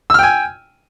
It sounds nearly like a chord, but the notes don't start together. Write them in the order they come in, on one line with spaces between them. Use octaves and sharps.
E6 F6 G5 G#5